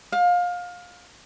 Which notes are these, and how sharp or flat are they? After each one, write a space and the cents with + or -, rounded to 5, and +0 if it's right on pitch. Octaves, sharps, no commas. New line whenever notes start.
F5 +25